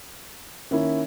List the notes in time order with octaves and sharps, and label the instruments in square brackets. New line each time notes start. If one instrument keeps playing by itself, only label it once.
[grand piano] D#3 A#3 C#4 E4